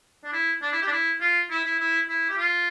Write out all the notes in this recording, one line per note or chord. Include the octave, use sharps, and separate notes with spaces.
D4
E4
D4
E4
G4
D4
E4
F4
E4
E4
E4
E4
G4
F4